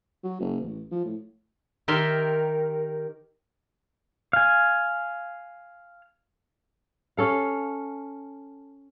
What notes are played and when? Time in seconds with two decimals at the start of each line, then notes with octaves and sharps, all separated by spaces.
0.24 F#3
0.40 F#1
0.62 A1
0.91 F3
1.05 A2
1.88 D#3 G4 A#4 E5 C6
4.33 F5 G#5
7.17 C#4 A4 F5